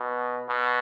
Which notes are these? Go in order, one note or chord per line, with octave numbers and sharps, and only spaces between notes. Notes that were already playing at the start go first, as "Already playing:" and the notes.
Already playing: B2
B2